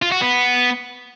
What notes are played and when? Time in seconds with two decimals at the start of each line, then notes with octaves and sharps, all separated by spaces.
0.02 F4
0.12 F#4
0.21 B3